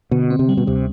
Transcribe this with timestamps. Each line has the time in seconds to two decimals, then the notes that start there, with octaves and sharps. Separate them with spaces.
0.11 B2 D3
0.30 C4
0.39 C3
0.49 G3
0.57 B2
0.67 D2 C3